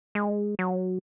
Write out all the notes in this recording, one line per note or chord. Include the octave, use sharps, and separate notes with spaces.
G#3
F#3